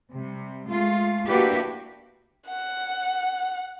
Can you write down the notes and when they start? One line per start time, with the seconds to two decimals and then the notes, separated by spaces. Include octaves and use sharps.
0.12 C3 G3
0.69 G#3 A3 F4
1.27 A#3 D4 E4 F#4 G4 B4
2.49 F#5